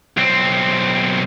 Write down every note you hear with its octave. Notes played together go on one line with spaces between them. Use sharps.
B1 C4